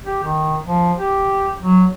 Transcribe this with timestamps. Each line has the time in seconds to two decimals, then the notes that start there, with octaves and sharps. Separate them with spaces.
0.05 G4
0.24 D#3
0.66 F3
0.97 G4
1.62 F#3